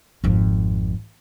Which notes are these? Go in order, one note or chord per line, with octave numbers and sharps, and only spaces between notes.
G#1 F2